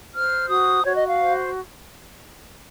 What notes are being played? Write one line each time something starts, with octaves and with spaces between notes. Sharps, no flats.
C5 F6
F#4 D#6
F#4 C#5
D#5
F5
C5